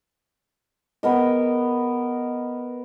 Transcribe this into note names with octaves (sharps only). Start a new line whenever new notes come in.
B3 A#4 D#5